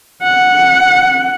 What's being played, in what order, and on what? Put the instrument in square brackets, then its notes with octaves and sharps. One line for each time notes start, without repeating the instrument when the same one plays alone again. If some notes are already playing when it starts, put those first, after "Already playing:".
[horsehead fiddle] F#5